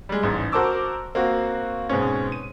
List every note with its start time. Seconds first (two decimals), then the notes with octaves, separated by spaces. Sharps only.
0.09 G3 G#3
0.23 A1 G#2
0.52 F#4 A#4 C5 A5 D6 E6
1.15 A#3 C4 F#4
1.89 G#2 B2 G#3 C4 C#4
2.32 D#7